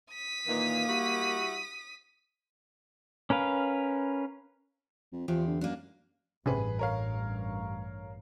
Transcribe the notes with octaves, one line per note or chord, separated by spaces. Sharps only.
D#6 B6
A#2 D#3 E3 A#3
G3 E4 F#4
C#4 A#4 B4 F5
F2
E2 F3 C4 G4
D3
F#2 A#3 D4
A1 G2 C3 C#4 G#4 B4
A#4 C#5 F5